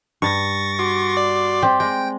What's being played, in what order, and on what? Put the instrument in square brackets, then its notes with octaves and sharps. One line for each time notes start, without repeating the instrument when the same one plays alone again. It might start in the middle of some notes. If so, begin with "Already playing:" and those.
[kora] G2 [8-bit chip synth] C#6 A6 A#6
[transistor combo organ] F#4 C6 D6
[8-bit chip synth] D5
[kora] C4 G4 D5
[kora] G#3 [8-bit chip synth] G5